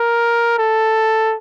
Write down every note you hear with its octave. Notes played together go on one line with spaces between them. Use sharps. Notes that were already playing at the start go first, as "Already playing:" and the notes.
Already playing: A#4
A4